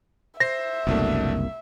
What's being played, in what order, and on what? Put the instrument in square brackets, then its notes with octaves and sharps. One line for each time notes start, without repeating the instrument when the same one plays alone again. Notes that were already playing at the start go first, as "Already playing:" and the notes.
[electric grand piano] C5 C7 [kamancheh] E5 [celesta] A#6
[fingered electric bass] F#1 C2 A#3 [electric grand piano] B2 A3 D4